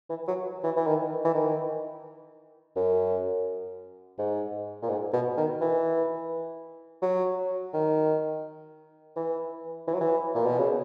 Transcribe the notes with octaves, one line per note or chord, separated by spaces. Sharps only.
E3
F#3
E3
E3
D#3
E3
D#3
F#2
G#2
A#2
G#2
B2
D#3
E3
F#3
D#3
E3
E3
F#3
E3
A#2
B2
C#3